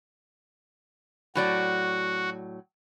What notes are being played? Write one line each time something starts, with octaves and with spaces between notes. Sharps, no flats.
A2 F#3 F#4 D5